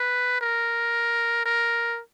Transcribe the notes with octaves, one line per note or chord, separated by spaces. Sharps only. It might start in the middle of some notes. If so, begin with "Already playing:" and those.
Already playing: B4
A#4
A#4